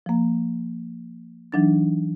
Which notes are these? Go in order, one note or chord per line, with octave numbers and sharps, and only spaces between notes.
F3 A#3
E3 F#3 D4 D#4 A6